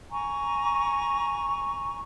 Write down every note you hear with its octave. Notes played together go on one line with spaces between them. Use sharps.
G#5 A#5 C#6